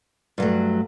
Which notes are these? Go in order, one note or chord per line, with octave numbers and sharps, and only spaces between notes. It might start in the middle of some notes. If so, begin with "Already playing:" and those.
G2 F#3 A3